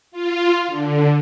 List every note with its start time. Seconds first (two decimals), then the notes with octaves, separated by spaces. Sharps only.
0.11 F4
0.68 D3